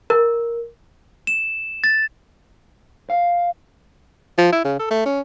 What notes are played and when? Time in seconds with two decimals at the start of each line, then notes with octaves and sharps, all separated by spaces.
0.10 A#4
1.27 E7
1.84 A6
3.10 F5
4.38 F3
4.52 E4
4.65 C#3
4.79 A4
4.91 A3
5.05 C#4